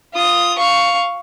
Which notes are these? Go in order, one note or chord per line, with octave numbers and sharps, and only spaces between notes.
F4 D#6
F5 C#6